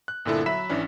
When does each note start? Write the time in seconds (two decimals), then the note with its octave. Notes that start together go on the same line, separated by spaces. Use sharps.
0.08 F#6
0.25 G1 A#2 D3 E4 A4
0.46 F#3 E5 B5 B6 E7
0.70 G#1 E3 C#4 D4